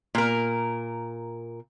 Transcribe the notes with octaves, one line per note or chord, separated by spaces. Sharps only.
A#2 A#4